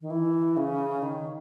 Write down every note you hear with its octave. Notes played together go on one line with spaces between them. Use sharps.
D#3
E3
C#3
D#3